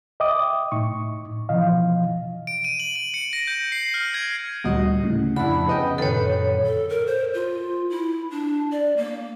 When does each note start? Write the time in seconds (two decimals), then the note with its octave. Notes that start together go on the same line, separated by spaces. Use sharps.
0.20 D#5 E5 G5 D6 D#6
0.72 A2 D#4 C#6
1.49 B2 E3 F3 D#5 F5
2.47 D7
2.65 D#7
2.80 F#7
2.96 D#7
3.14 C#7
3.33 A#6
3.47 G6
3.72 C7
3.94 F6
4.14 G#6
4.64 D2 A#2 G3 F#4 D#5
5.03 A2 C#3
5.36 F2 D4 E4 F#5 B5
5.68 C#3 B3 D#5 G5
5.98 F#2 A#2 D3 D#3 A4 B4 C#5
6.65 A4
6.89 A#4
7.06 C5
7.34 F4
7.90 E4
8.31 D4
8.71 D5
8.97 A#3